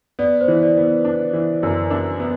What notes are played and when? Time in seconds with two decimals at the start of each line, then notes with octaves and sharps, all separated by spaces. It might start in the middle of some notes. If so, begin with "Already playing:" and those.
0.19 B3 D5
0.41 C5
0.48 E3
0.62 D5
0.77 B3
0.83 B4
1.05 D4
1.33 E3
1.63 F#2
1.90 D4
2.20 B3